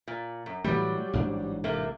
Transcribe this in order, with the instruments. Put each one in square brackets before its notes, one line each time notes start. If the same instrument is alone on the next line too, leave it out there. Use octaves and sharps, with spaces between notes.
[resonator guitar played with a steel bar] A#2
F#2
[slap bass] A2 E3 A3 [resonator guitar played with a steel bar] F#3 G3
[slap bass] A1 G#2 D4
[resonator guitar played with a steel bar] C3 A3 A#3